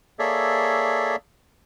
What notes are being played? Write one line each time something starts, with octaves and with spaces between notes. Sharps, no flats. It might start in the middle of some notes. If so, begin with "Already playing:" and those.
A#3 G#4 A4 C#5 D5 E5